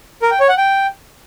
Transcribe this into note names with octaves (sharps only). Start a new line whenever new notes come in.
A#4
G5
C#5
F#5
G5